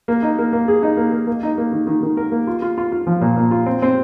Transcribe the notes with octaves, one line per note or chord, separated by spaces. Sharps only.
A#3
D#4
A#3
A#3
G#4
D#4
A#3
A#3
A#3
D#4
A#3
D#3
D#3
D#3
A#4
A#3
F4
F4
F4
F4
F3
A#2
A#2
F4
C4
C4